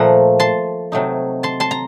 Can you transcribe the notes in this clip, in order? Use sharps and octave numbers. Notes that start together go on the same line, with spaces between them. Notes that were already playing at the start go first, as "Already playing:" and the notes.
Already playing: A#2 F3 A3 F#5 A#5
A5 C6
C3 F#3 A3 D#4
A5 C6
A5 C6
A#5